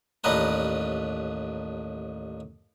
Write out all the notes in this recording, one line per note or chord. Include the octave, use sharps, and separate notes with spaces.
A1 D#2 D4 D#4 B4 A#5